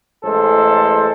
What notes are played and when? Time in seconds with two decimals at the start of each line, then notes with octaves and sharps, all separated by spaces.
0.24 A1 G#3 A4 C5